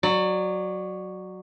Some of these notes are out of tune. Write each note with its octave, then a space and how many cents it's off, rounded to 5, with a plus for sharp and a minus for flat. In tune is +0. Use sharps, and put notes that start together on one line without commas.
F#3 +0 D5 +25